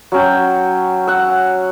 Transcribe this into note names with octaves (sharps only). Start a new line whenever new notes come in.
F#3 C#4 G5
F#5 E6